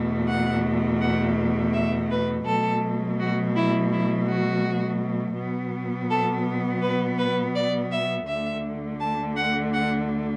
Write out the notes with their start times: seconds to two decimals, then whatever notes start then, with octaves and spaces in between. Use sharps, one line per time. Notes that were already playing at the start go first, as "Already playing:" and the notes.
Already playing: E2 B2 A3
0.28 F#5
1.01 F#5
1.74 E5
2.11 B4
2.46 B2 F#3 A3 A4
3.20 F#4
3.56 E4
3.92 E4
4.28 F#4
5.37 B2 F#3 B3
6.10 A4
6.82 B4
7.19 B4
7.55 D5
7.91 E5
8.28 D2 D3 A3 E5
9.00 A5
9.36 F#5
9.73 F#5